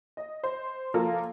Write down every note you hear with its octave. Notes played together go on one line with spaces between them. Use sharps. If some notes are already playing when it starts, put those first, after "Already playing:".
D#5
C5
F3 A#3 F4 A4 A#4